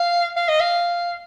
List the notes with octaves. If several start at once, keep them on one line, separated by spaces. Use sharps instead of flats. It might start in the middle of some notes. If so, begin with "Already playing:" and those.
Already playing: F5
F5
D#5
F5